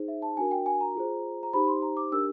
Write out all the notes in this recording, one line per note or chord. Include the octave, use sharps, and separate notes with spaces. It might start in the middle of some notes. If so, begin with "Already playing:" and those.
Already playing: D#4 G#4 C5
E5
A5
D4 F#4 A#4 G#5
G5
G#5
A#5
F4 G#4 C5
A#5
D#4 G4 C5 B5
C6
A#5
D6
D4 G4 A#4 E6